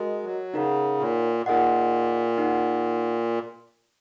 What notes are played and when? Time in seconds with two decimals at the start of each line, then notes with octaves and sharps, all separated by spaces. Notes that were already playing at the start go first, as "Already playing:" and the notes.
Already playing: G#3 F#4 A#4 D#5
0.24 F#3
0.54 C#3 D#4 A#4 C#5 F#5
0.99 A#2
1.46 A#2 D#4 G#4 D#5 F#5
2.38 D#4 G#4 F#5